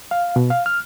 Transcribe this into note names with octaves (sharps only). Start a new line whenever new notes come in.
F5
B2
F5
F6